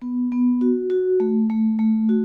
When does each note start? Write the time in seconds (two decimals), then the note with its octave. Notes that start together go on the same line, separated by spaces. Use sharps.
0.02 B3
0.32 B3
0.61 F#4
0.90 F#4
1.20 A3
1.50 A3
1.79 A3
2.09 F#4